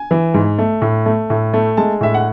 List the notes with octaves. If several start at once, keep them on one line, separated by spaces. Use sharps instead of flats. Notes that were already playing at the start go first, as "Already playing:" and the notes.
Already playing: G#5
E3
G#2
A3
A2
A3
A2
A3
G#3 A5
A2 E5
F#5